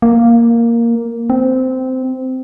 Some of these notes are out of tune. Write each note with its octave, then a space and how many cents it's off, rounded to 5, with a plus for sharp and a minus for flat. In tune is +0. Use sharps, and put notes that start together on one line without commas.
A#3 +0
C4 -15